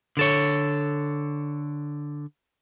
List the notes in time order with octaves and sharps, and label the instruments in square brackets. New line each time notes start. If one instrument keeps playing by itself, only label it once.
[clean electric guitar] D3 A4 C#5